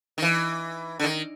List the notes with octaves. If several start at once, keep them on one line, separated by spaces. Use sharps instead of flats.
D#3
E3
D3
D#3